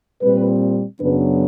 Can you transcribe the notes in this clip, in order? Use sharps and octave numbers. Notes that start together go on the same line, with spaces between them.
A#2 G3 C4 B4
F#2 C#3 F#3 B3 D4 B4